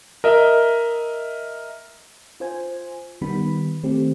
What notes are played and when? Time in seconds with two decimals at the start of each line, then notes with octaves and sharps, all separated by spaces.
0.24 A#4 D#5 E5
2.40 F4 C5 G#5
3.22 D#3 G3 B3 B5
3.83 D#3 A3 C4 G4